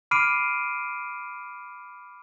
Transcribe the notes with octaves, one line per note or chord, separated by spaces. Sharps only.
B5 D6 F6 C7 D7 D#7